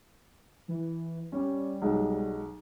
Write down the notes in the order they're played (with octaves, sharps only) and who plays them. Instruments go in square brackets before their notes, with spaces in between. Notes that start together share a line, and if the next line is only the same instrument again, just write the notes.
[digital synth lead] E3
[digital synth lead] G3 [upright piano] C#4
[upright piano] B1 F#3 G#3